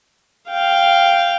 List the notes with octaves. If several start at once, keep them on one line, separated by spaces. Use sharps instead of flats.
F5 G5